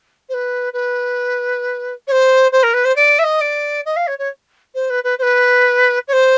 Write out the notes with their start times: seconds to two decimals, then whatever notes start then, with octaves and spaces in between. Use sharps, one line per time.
0.29 C5
0.34 B4
0.73 B4
2.07 C#5
2.12 C5
2.52 C5
2.63 A#4
2.74 B4
2.85 C5
2.96 D5
3.19 E5
3.24 D#5
3.41 D5
3.86 D#5
3.96 F5
4.07 C#5
4.19 C#5
4.75 C5
4.90 B4
5.04 B4
5.19 C5
5.22 B4
6.08 C#5
6.13 C5